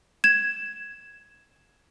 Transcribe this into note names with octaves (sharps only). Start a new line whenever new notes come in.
G#6 E7